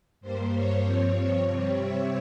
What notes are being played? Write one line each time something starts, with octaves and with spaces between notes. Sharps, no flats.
G2 G3 A#3 C5
C#5
G2 F3 C4
C3 G3 C4 C#5
E5